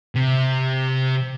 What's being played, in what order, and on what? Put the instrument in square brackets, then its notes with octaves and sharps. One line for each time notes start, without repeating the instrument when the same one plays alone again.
[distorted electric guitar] C3